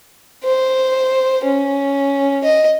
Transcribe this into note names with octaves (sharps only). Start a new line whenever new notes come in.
C5
C#4
D#5